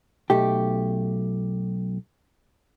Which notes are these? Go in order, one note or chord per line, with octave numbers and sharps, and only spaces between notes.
B1 A3 G4